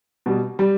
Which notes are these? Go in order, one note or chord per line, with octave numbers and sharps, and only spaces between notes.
B2 G3
G3